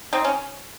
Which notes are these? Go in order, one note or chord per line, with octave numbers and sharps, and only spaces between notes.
C4 D#4
C#4